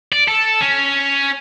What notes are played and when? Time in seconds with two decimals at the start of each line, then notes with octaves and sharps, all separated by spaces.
0.12 D5
0.28 A4
0.61 C#4